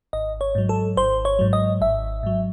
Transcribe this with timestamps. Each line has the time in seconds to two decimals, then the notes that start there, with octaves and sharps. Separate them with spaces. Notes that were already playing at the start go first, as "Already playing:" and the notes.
0.13 G#1 D#5
0.41 C#5
0.55 G#2 F#3
0.69 A4
0.97 G#1 C5
1.25 C#5
1.39 G#2 F#3
1.53 D#5
1.81 G#1 E5
2.23 G#2 F#3